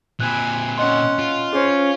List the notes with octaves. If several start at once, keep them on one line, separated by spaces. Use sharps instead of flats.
A#2 C4 G#5 B5 F#6
C#4 D#5 F#5 C6
F4
C#4 G#4 C5